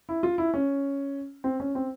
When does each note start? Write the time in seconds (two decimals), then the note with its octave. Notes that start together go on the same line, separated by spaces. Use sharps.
0.09 E4
0.23 F4
0.38 E4
0.54 C#4
1.44 C4
1.60 C#4
1.75 C4